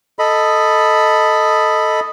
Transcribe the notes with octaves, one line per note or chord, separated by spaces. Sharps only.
A4 D#5 B5